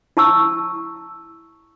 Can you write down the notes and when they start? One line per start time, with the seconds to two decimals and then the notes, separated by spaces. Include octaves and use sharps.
0.17 E4 A5 C#6 E6